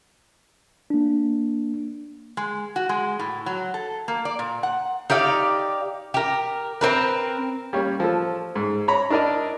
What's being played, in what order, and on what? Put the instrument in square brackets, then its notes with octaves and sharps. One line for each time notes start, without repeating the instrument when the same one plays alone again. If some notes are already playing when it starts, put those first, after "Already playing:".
[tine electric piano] A#3 D4
[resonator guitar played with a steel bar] G#3
F#4
G#3
A2
F#3
A4
A#3
D5
A#2
F#5
[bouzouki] D#4 G4 D5 F5
G4 A#4
C4 A#4 B4
[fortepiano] G3 A#3 C#4 C#5
F3 A4
G#2
C#5 A#5 B5 C#6
D4 E4 A#4 D5 D#5